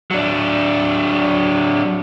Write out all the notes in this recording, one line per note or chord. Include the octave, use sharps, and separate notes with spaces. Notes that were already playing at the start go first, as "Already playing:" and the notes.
F#3 D4